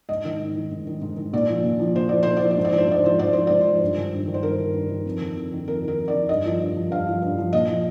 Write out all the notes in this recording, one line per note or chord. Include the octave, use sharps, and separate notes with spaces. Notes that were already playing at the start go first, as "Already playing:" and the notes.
G#2 D#5
D#3
G#2
D#3
G#2
D#3
G#2
D#3
A#2 D5
F3
A#2
F3
A#2 C5
F3 D5
A#2 C5
F3 D5
C5
G#2
D5
F3
C5
G#2 D5
F3 C5
G#2 D5
F3 C5
G#2 D5
C5
F3
G2
D#3
G2
D#3
C5
G2 A#4
D#3
G2
D#3
F2
D#3
F2
D#3
F2 A#4
D#3 A#4
F2
D5
D#3
G2 D#5
F3
G2
F3
G2 F5
F3
G2
F3
A#2 D#5
F3